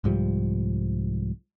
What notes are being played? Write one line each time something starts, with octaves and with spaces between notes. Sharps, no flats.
C2 G#2 F3 G3